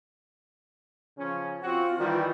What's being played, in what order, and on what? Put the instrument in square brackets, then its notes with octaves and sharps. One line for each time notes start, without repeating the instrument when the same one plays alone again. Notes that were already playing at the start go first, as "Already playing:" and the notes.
[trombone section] C#3 F3 C#4
[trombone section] C4 F#4 [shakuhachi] F4
[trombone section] D#3 E3 G3